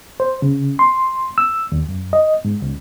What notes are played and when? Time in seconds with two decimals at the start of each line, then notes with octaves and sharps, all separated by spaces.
0.20 C5
0.42 C#3
0.79 C6
1.38 E6
1.72 D#2
1.89 F#2
2.13 D#5
2.45 G#2
2.62 C#2